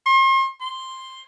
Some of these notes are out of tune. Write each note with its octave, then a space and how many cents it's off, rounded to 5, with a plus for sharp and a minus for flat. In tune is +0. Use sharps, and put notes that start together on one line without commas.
C6 +40
C6 +5